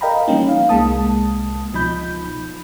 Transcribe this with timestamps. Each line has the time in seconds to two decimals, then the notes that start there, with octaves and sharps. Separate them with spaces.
0.01 A#4 D#5 F5 G5 A#5 B5
0.28 E3 F3 G3 A#3 C#4 D#4
0.49 F5
0.69 C2 G#3 A#3 A5 D#6
1.73 C#2 B2 F3 D#4 B5 G6